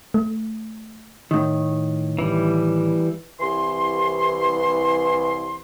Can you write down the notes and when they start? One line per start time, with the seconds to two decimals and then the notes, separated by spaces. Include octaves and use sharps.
0.14 A3
1.31 A2 D#3
2.19 E3 G3
3.40 C2 E3 C6